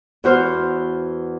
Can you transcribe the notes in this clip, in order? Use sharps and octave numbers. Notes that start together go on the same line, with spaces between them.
E2 F#4 C5 F6